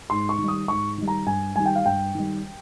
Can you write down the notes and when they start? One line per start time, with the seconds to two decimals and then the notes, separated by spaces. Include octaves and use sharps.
0.10 G#2 C6
0.29 C#6
0.38 D#3
0.44 G3 D#6
0.68 G#2 C#6
0.98 D#3 G3
1.08 A#5
1.26 G2 G#5
1.56 D#3 G3 G#5
1.66 G5
1.76 F5
1.85 G2 G5
2.15 D#3 G3